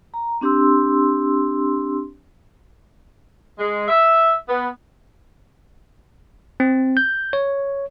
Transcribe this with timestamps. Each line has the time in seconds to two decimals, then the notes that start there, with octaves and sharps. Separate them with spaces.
0.14 A#5
0.41 C4 D4 G4 C6 E6
3.59 G#3
3.88 E5
4.48 B3
6.60 C4
6.97 G6
7.33 C#5